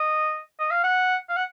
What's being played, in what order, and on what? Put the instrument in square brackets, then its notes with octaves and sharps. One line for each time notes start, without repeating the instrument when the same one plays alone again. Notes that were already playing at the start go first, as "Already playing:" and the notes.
Already playing: [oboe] D#5
D#5
F5
F#5
F5
F#5